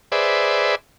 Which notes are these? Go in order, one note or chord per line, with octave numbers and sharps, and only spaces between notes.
G#4 B4 C5 D5 E5